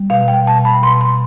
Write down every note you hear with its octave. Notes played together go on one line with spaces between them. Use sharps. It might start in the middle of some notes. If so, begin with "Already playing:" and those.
Already playing: G3
B2 F5
G5
B2 A5
B5
B2 C6
C6